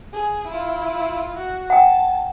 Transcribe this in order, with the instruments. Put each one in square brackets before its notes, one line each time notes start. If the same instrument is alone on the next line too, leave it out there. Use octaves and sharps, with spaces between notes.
[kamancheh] G#4
E4 F4
F#4
[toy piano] F#5 G5 [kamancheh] A5